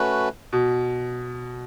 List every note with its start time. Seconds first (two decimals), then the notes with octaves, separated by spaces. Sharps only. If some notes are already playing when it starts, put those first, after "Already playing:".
Already playing: A3 C#4 F#4 B4
0.53 B2